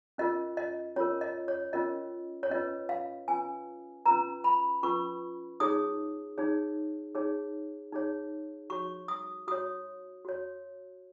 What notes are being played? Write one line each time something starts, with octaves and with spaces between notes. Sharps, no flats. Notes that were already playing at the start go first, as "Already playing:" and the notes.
C#4 F4 A#4 D#5
D#5
C#4 F4 A#4 C#5
D#5
C#5
C#4 F4 A#4 D#5
C#5
C#4 F4 B4 D#5
F5
C#4 F4 B4 G#5
C#4 F4 B4 A#5
B5
C#4 F4 B4 C#6
D#4 G#4 C#5 D#6
D#4 G#4 C#5
D#4 G#4 C#5
D#4 G#4 C#5
F#4 C#5 C#6
D#6
F#4 C#5 D#6
F#4 C#5